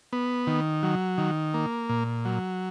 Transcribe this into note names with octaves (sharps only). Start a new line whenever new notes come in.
B3
D#3
F#3
D#3
A#3
A#2
F#3